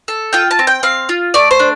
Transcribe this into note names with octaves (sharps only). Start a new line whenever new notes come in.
A4
F4 G5
A5
C4
G5
C4 F5
F4
A3 D5
C5
D4